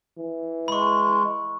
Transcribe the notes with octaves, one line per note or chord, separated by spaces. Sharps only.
E3
G#3 B5 C#6